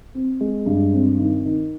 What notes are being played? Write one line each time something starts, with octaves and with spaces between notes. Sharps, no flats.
C4
G#3
G2
C4
D#3
D#3